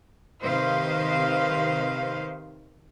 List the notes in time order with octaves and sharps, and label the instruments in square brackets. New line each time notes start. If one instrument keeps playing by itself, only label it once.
[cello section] C3 D#3 B4 C5 D#5 F5